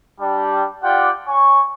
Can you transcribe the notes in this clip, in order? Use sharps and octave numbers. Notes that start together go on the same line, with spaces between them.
G3 D4
F4 G4 D5 F#5 G5
C#5 G#5 C#6